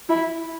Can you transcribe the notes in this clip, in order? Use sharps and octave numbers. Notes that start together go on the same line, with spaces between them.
E4